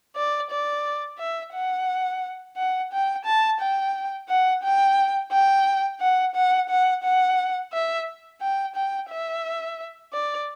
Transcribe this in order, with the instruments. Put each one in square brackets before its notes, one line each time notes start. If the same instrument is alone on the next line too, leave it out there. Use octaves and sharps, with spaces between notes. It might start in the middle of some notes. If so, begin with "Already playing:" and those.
[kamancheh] D5
D5
E5
F#5
F#5
G5
A5
G5
F#5
G5
G5
F#5
F#5
F#5
F#5
E5
G5
G5
E5
D5